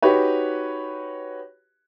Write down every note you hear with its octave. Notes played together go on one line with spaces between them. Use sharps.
D#4 F#4 G4 B4 C#5